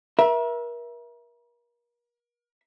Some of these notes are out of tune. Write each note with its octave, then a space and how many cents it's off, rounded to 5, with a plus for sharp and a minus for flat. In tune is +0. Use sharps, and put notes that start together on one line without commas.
A#4 +40 E5 +0